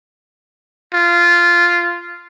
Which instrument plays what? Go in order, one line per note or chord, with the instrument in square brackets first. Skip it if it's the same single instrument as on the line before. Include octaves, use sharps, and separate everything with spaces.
[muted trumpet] F4